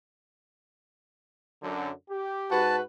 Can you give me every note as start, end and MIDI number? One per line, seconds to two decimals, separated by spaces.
1.62 1.91 42
1.62 1.91 50
2.10 2.60 67
2.52 2.82 44
2.52 2.82 66
2.52 2.82 71
2.52 2.76 81